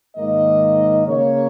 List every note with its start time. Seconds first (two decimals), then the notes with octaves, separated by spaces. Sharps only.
0.17 G#2 D#3 A#3 D#5
1.06 C#3 A#3 C#5